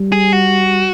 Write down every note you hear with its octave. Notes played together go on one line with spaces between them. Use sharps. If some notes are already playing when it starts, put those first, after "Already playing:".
Already playing: G3
G#4
F#4